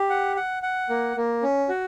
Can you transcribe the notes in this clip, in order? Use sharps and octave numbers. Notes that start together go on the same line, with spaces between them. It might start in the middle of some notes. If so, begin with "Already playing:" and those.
Already playing: G4
F#5
F#5
F#5
A#3
A#3
C#4
F#4